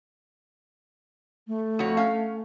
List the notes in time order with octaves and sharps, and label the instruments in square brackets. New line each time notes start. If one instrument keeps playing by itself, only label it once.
[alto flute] A3
[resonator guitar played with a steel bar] F2 F#4 C#5
C#4 F5